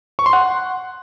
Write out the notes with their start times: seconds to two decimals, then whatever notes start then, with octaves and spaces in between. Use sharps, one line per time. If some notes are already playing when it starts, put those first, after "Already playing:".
0.19 C#6
0.26 C6
0.33 F#5